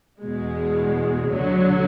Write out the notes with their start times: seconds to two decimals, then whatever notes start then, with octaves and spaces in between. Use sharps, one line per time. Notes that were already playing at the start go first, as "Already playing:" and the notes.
0.20 E2 B2 G#3
1.32 D2 D3 F#3